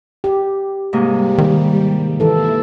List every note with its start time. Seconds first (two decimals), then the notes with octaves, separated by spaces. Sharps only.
0.24 G4
0.93 G#2 C3 G3 A#3
1.38 D#3
2.20 E3 A#3 E4 A4